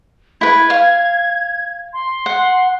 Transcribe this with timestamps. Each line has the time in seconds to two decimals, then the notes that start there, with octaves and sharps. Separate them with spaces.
0.41 E4 B4 G#6
0.70 F5
1.93 C6
2.26 F#5